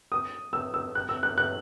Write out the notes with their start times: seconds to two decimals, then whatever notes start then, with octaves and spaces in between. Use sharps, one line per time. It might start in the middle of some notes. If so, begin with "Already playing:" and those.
0.12 D#6
0.53 E6
0.74 E6
0.95 F#6
1.09 E6
1.23 F#6
1.38 F#6